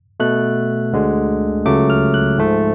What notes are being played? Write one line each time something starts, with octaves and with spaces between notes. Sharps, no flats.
B2 A3 F#6
D2 D3 G#3
C#2 C#3 F#3 A3 D6
F6
F#6
G#2 F3 A3